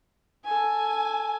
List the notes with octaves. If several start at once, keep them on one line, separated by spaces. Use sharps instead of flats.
A4 G#5